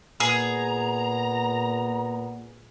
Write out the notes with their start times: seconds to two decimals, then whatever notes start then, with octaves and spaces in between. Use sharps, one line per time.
0.20 A#2 B3 G#4 A#5